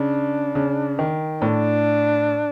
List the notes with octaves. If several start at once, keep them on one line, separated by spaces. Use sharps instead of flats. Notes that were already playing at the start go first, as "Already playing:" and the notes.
Already playing: C#3 D4
C#3
D#3
A2 D4